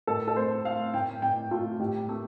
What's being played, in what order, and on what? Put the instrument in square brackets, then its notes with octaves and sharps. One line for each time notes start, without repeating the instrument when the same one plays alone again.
[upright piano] A2 A4
A4
A3 C5
A3 F5
A2 G5
A2 G5
A3 F4
A2 G4
A3